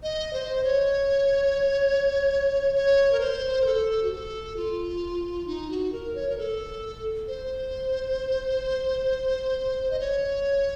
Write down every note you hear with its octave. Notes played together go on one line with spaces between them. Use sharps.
D#5
C5
C#5
C#5
A#4
C5
A#4
A4
F#4
A4
F4
D#4
F#4
A#4
C#5
A#4
A4
C5
D#5
C#5